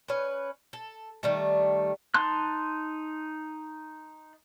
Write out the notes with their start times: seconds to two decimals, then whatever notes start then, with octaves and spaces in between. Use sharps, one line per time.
0.08 C#4 B4
0.73 A4
1.23 D#3 G3 A3
2.14 D#4 A5 C6 F#6